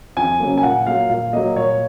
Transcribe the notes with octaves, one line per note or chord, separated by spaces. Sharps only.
F2 G#5
C#3 F#3 A#3
G#5
A#2 F#5
F#3 A#3 F5
A#2 F5
F#3 A#3 D#5
A#2 C#5